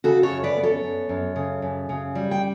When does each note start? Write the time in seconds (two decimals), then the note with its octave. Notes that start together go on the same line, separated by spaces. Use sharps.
0.04 C#3 F#4 A4
0.23 A4 C#5
0.30 F#2
0.44 B4 D5
0.57 B3
0.63 A4 C#5
0.83 F#2
1.09 F#2
1.36 C#3
1.62 F#2
1.89 C#3
2.15 G3
2.31 G5